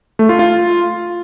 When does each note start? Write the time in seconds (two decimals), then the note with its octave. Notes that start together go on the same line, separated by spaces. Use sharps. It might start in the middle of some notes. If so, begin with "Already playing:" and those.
0.19 A3
0.29 F4
0.39 F4